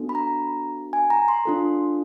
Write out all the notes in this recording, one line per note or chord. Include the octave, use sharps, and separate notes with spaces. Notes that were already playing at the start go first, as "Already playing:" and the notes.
Already playing: B3 D4 F#4 A4
B5
A#5
G#5
A#5
C6
D4 F4 A4